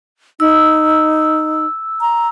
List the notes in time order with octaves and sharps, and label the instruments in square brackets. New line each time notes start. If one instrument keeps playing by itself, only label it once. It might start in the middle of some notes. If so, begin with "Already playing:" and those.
[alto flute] D#4 [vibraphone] E6
[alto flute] A#5